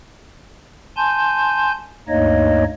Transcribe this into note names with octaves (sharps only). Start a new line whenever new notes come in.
G#5 A5 C6 G6
D2 G2 A#3 D#4 C#5 D#5